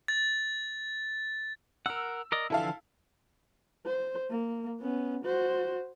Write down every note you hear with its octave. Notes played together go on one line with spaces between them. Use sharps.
A6
A#4 F#5 E6
A#4 D5 D#5
D3 E3 F3 E4 A4 F5
C5
A#3
B3 C#4
F#4 C5